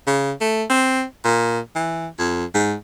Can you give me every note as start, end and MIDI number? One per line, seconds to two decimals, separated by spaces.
0.07 0.32 49
0.41 0.64 57
0.70 1.03 60
1.25 1.60 46
1.75 2.08 52
2.19 2.45 41
2.54 2.75 44